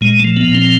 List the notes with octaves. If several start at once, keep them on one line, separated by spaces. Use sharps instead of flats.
A#2 G#3
A3
F3
B3
A#2
C4